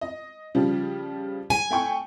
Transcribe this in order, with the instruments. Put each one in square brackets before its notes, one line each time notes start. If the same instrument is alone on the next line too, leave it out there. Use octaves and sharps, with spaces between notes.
[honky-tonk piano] D#5
C#3 F3 G3
[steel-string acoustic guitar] G#5
[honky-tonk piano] A3 G5 C#6